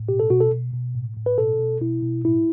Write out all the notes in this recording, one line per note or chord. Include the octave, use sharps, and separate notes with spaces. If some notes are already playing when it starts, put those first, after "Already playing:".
Already playing: A2
B2 G4
A4
B2 F#4
A4
B2
B2
A2
A2
B4
B2 A4
B2
B2 E4
B2
A2 E4